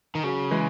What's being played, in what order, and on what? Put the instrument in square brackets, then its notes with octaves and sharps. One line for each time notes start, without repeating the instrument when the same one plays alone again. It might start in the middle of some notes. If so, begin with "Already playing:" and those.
[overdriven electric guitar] D#3
[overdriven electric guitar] C#3 [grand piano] F#3
[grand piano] E3 G#3